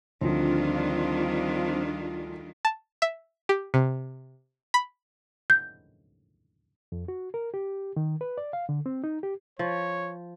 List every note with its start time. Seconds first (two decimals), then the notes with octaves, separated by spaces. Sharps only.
0.21 D2 D#3 F3 G3 C4 D4 F4
2.65 A5
3.02 E5
3.49 G4
3.74 C3
4.74 B5
5.50 G6
6.92 F2
7.08 F#4
7.34 A#4
7.54 G4
7.96 D#3
8.21 B4
8.38 D5
8.53 F5
8.69 D3
8.86 C4
9.04 D#4
9.23 G4
9.59 F3 C#5